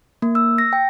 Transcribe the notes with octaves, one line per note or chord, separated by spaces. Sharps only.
A#3
E6
A#6
G5